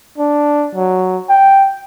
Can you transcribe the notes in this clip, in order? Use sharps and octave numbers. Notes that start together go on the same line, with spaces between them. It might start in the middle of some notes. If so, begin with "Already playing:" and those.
D4
F#3
G5